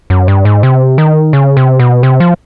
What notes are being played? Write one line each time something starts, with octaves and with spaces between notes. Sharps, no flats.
F#2
G2
G#2
C3
D#3
C#3
C3
B2
C3
F3